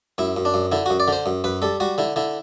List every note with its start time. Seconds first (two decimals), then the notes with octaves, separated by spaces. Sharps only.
0.18 F#2 E4
0.36 F#2
0.45 D4
0.54 F#2
0.72 D3 E4
0.86 F#2 F#4
1.00 D5
1.08 D3 C5
1.26 F#2
1.44 F#2 B4
1.62 G3 A4
1.80 G3 F#4
1.98 D3 E4
2.16 D3 E4